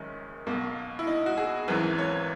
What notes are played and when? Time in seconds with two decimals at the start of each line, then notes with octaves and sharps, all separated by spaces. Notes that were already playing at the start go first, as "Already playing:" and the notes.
Already playing: F#1 F#2 D#3 G#3 C#4 D#4
0.46 B1 B2 A#3
0.99 E4
1.07 D#4
1.26 F#4
1.38 G#4
1.68 G#1 F#2 E3 B4
1.98 C#5